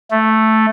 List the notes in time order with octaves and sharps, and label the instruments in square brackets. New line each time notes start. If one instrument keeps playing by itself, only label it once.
[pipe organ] A3